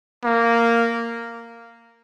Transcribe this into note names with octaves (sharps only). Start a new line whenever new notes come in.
A#3